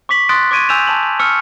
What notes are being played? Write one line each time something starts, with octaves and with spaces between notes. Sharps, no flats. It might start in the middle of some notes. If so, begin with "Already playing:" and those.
C#6 D6 B6 F#7
C6 D#6 F#6 A6 D7
C#6 D6 G#6 D7 D#7
G#5 E6 G6 E7 F7
A5 F#7
C#6 E6 F6 C#7